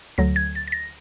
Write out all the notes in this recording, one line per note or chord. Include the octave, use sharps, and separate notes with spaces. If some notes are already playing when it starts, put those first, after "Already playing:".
D2 D3 F#3 A#6
G#6
A6
A6
A#6